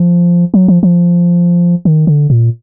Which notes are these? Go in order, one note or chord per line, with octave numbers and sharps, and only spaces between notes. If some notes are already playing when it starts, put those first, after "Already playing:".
Already playing: F3
F#3
F3
F3
D#3
D3
A#2